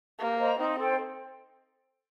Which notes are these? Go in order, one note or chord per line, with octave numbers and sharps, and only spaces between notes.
A#3 G4
C5 D#5 A#5
C4 D#4
A4 C5 G5